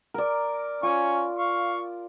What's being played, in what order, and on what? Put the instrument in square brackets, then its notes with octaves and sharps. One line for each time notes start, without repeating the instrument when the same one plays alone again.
[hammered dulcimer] A#4 D5
[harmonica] C#4 G#5 C#6 [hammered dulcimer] F4
[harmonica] F5 C#6